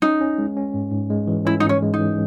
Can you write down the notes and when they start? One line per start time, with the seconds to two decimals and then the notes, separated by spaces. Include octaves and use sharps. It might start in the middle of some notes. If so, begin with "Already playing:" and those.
0.02 C#4 D#4
0.21 C#4
0.38 G#3
0.57 C#4
0.74 G#2
0.92 G#2
1.10 G#3
1.27 E3
1.45 C#4 E4
1.60 G#2 D#4
1.69 C#4
1.82 G#3
1.94 D#4
1.99 E3